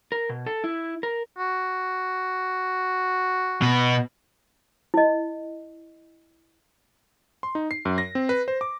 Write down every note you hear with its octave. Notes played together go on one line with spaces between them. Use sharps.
A#4
B2
A4
E4
A#4
F#4
B2 B3
E4 D#5
C6
D#4
C7
F#2
A#6
C4
B4
C5
D6